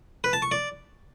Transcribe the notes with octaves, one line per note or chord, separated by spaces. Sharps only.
B4
A5
C#6
D5